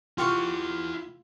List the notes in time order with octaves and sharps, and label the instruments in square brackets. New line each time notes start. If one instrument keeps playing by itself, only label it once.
[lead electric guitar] E4 F#5 [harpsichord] F4 [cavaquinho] G4 F5 C#6